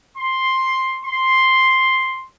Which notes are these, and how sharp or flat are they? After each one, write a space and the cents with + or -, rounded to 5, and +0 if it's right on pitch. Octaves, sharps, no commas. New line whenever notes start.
C6 +5
C6 +5